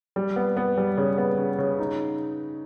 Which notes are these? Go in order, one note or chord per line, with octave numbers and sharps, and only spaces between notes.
G3
B3
B3
G3
C#3
B3
C#3
C#3
D#4